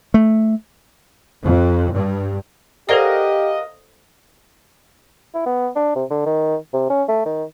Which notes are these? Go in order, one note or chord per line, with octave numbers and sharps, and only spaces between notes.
A3
F2
G2
F#4 G4 A4 A#4 C5 D5 D#5 F5
E4
B3
D4
C3
D3
D#3
C3
C#4
A3
D#3